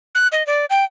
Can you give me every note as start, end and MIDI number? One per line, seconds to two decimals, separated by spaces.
0.15 0.28 90
0.32 0.45 75
0.46 0.65 74
0.70 0.84 79